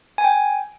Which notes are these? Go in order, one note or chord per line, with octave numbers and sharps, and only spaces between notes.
G#5
G5